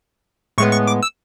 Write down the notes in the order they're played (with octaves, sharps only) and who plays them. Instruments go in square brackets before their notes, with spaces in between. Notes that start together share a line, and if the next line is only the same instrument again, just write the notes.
[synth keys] A2 G#3 B3 C#6
C#6
D6
E6